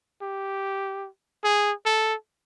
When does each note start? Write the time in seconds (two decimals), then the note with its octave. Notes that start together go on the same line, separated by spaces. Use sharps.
0.22 G4
1.44 G#4
1.86 A4